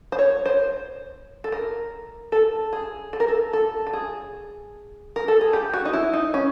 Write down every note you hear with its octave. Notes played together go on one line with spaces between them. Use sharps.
C5
C#5
C5
A4
A#4
A4
G#4
A4
A#4
A4
A4
A4
G#4
A#4
A4
G#4
G4
F#4
D#4
E4
D#4
C#4